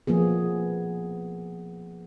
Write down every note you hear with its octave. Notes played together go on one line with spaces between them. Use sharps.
F3 A#3 B3 G#4